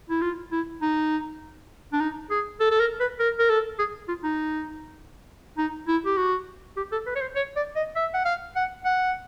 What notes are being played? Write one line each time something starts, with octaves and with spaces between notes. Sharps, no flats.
E4
F4
E4
D#4
D4
D#4
G#4
A4
A4
A#4
B4
A#4
A#4
A4
G#4
F4
D#4
D#4
E4
G4
F#4
G4
A4
B4
C#5
C5
C#5
D5
D#5
E5
F#5
F5
F#5
F#5